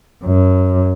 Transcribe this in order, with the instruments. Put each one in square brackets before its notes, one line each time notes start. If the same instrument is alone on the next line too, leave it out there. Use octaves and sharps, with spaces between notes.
[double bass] F#2